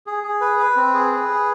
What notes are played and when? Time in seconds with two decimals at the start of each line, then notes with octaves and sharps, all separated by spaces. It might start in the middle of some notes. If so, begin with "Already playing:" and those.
0.07 G#4
0.23 G#4
0.41 B4
0.59 B4
0.76 C4
0.94 G#4
1.12 B4
1.29 G#4